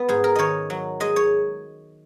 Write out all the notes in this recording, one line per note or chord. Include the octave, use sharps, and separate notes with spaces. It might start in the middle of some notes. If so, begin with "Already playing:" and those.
Already playing: B3
G#2 G#4
A#4
D#3 C#5 D#5
F#3
G#3 D#5
C#5